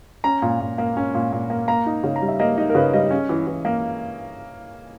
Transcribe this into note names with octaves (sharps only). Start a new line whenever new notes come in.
C#4 A#5
A#2
A#2
A#3
C#4
A#2
A#2
A#3
A#3 A#5
D#4
C#3
A#5
G3
E5
A#3 D#5
D#4 D#5
A#4
C#3 B4
G3 D#5
C#4
E3
E3
A#3